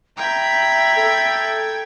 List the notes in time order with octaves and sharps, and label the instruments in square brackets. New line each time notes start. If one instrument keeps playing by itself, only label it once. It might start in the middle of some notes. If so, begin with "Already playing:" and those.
[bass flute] E5 [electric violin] G5 G#6 [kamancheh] A#5 B5
[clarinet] A4